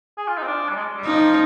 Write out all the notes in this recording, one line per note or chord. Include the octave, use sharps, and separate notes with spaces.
G#4
F4
D#4
C4
D4
G3
G#3
G3
F3 D#4